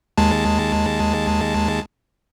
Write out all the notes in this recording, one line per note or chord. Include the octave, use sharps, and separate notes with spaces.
D#2 G#3 A5